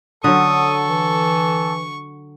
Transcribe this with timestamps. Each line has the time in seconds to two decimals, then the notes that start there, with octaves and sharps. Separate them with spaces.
0.24 D3 F#3 A4 C#6 D#6
0.89 E3